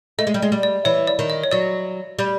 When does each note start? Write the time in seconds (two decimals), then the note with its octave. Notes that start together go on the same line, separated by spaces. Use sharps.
0.19 A3 D#5
0.27 G#3
0.34 G3
0.42 G#3
0.52 G3
0.63 D5
0.85 E3 C#5
1.07 D5
1.19 D#3
1.30 D#5
1.44 C#5
1.52 F#3 D5
2.19 G3